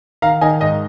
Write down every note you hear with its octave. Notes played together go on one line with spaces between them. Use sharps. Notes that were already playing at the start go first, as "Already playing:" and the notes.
D#3 F5 A#5
D#3 D#5 G#5
G#2 D#5